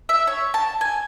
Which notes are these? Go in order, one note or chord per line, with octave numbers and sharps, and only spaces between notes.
E5
C#5
A5
G#5